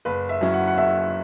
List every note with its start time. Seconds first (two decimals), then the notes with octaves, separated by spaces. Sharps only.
0.05 F#1 B4
0.29 E5
0.41 F#2 F#3 C#4 E4
0.54 F#5
0.67 F#5
0.77 F#1 E5